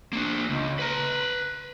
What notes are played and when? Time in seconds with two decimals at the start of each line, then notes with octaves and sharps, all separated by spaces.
0.13 A#3 D4
0.50 C#2
0.79 B4 A#5